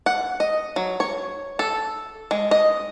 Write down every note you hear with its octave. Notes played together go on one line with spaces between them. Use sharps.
F#5
D#5
F#3
C#5
A4
G#3
D#5